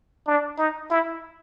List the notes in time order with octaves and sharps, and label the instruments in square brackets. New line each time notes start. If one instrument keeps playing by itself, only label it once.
[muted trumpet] D4
D#4
E4